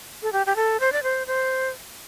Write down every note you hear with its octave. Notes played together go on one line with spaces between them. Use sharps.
A4
G4
G4
A4
C5
D5
C5
C5